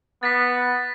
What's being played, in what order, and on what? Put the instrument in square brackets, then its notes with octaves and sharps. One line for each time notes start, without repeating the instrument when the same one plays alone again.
[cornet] B3 [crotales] A6 B6